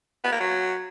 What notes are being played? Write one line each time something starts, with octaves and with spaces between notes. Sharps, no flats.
B3
A#3
F#3